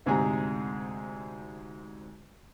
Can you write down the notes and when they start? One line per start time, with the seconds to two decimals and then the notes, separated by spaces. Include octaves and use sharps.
0.06 D2 G#2 C3 G#4 G#5 A#5